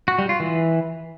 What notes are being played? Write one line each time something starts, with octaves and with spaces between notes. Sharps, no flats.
F#4
G3
F4
E3